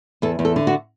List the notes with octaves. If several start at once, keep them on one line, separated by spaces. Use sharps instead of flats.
E2 A4
E2
A4
D3
F#4